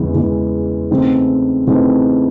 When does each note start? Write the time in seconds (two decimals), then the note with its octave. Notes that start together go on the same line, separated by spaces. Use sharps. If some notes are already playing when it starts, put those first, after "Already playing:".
Already playing: E2 C#3 E3 G#3
0.14 E2 C#3 E3 G#3
0.91 C#3 E3 A3 C4 D#4
1.67 C#3 E3 A3 C4 D#4